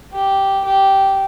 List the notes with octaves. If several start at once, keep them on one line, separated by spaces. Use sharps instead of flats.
G4
G4